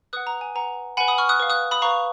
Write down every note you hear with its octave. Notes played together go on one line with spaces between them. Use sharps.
B4 F#5 D#6 F#6
A#5
G#5
B4 F#5 A#5
B4 F#5 G#5 B5
B5 D#6
C#6 F6
D#6 F#6
B4 F5
D#6 F#6
B5 D#6
B4 F5 A#5 C#6